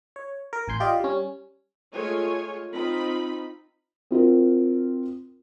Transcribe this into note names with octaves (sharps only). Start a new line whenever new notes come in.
C#5
A#4
A1 G#5 C6 G6
F4 G4 D5 D#5 F5
G3 C#4
G#3 A3 F4 C#5 G#5
C4 D#4 F4 B5
C4 F4 F#4 A#4